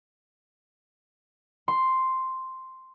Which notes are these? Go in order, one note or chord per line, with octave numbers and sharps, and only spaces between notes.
C6